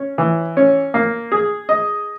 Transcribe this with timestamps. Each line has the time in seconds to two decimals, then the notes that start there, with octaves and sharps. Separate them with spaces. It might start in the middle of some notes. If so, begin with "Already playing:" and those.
Already playing: C#4
0.18 E3
0.57 C#4
0.94 A#3
1.32 G#4
1.69 D#5